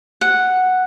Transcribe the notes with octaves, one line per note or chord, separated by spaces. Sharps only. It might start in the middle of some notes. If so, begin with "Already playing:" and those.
F#5